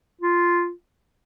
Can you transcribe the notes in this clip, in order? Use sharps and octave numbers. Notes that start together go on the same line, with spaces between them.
F4